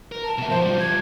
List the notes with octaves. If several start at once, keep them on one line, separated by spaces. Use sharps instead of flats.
A#4
A5
B2 E5
C#2 F3 C5
G3 F4
G#6